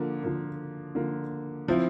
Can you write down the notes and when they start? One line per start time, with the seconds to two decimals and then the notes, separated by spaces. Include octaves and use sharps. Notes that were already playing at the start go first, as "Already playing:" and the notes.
Already playing: D3 F3 A#3
0.23 D3 F3 A#3
0.95 D3 F3 A#3
1.68 F3 C4 E4